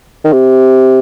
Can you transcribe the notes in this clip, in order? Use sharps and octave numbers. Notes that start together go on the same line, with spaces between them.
D#3
C3